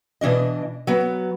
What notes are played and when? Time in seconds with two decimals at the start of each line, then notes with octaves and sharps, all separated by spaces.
0.21 B2 E3 D4 D#5
0.87 F#3 B3